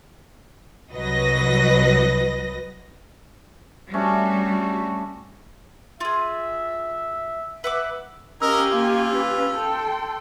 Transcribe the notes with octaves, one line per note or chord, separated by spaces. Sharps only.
C2 F#3 B4 D#5 A#6
G3 A3 C#4 D4 F#4
F4 G#4 E5
B4 E5 F#5 D6
C#4 G4 A#4 D#5 F5 G#5 E6
A#3 C#4 F4
C#4 B4
A4 G5 C6